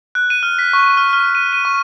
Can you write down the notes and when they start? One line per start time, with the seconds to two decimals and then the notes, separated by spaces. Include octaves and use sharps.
0.15 F#6
0.30 D#7
0.43 F6
0.59 B6
0.73 C#6
0.97 F6
1.13 F6
1.35 D#7
1.53 D#7
1.65 C#6